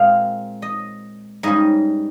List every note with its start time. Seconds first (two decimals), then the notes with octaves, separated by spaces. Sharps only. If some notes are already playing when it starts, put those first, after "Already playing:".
Already playing: A#2 G#3 C4 F5
0.62 D#5
1.43 G#2 G3 C#4 D#5